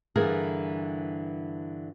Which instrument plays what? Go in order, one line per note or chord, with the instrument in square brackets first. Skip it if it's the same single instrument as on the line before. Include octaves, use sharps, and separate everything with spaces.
[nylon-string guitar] G2 D3 E3 G#4 A#4